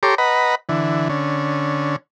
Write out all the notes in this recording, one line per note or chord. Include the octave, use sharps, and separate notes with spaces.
G4 A4 C#5 A#5 C6 D6
B4 D#5 F#5 A#5 B5
D3 E3
D3 C#4